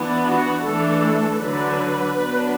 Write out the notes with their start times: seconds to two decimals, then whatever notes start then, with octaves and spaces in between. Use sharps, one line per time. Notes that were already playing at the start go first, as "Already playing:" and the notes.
Already playing: E3 B3 D4
0.25 F#4
0.64 E3 A3 D4 A4
1.40 D3 F#3 D4 B4
2.17 F#3 B3 D4